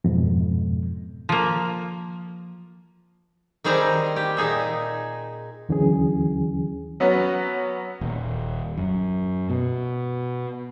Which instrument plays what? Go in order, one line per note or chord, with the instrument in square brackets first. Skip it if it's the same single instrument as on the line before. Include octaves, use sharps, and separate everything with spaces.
[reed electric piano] F2 G#2 B2
[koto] F3 A#3
D#3 G3 C4 G#4 C5 A#5
G4
A#2 D#4 G#4 E5
[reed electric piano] D#2 D3 E3 F#3 C#4 G#4
[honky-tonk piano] F#3 B3 C#4 F#4
[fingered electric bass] D#1
F#2
B2